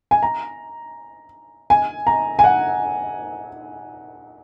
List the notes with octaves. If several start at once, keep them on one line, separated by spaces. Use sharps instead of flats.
G#5
A#5
G#5
A#5
G#5
F#5